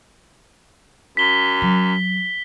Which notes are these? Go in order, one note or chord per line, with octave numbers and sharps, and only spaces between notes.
F#2 B6 G7
F#3